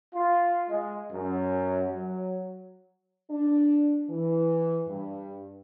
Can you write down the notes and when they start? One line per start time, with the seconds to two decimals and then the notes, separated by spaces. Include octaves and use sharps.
0.14 F4
0.69 G#3
1.11 F#2
1.88 F#3
3.31 D4
4.10 E3
4.88 G2